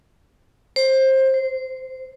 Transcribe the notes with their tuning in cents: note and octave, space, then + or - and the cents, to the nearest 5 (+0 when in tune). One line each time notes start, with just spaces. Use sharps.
C5 +20
C5 -15